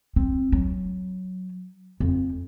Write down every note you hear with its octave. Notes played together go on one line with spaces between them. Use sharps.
C4
F#3
F2